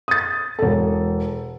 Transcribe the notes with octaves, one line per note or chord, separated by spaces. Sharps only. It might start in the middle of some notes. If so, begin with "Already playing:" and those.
D#6 A6
E1 A4